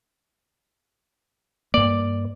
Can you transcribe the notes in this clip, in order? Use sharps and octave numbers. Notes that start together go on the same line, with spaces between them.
G2 A#3 D5